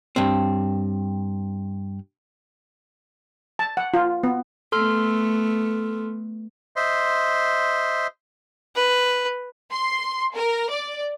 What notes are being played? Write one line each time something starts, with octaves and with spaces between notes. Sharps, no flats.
G2 C4
A5
F#5
F4
B3
A3 B3 A4 C6 F6
C5 D#5 E5 C6
B4
C6
A#4
D5